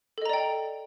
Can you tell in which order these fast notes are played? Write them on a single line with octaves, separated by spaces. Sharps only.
A4 D#5 A#5 D5 G5